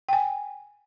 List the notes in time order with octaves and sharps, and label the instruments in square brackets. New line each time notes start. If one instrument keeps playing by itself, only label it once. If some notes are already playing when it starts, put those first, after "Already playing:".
[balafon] G5 G#5